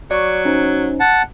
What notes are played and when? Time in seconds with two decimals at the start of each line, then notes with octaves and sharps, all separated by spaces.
0.11 F#3 D5 C#6
0.45 C#4 D#4 C5
1.00 F#5 A5